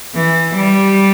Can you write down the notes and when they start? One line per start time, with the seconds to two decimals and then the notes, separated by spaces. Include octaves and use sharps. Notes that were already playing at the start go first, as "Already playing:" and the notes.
0.15 E3
0.54 G3